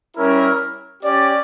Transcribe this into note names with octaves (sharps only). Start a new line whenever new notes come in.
G3 C#4 E4 A#4
C#4 G4 D5